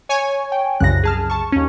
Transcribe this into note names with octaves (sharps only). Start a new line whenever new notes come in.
C#5 G#5
G5
C2 F#2 C#3 F#6 A#6
G#4 A5 F6
A5 C#6
D#2 C#4